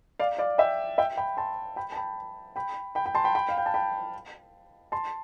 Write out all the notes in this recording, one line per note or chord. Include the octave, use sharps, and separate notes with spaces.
D5 F5
D5 F5
E5 G5
E5 G5
G5 B5
A5 C6
G5 B5
A5
G5 B5
G5 B5
G5 B5
G5 B5
A5 C6
G5 B5
G5 B5
F5
G5
A5
G5 B5
A5 C6